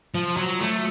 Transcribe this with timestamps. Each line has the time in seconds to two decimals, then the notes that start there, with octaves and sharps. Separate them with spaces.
0.15 F3
0.37 F#3
0.60 A3